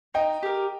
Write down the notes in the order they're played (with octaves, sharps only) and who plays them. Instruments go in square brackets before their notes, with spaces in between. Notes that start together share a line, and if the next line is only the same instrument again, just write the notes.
[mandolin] D#4 [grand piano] D#5 G5
[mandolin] G4 A#4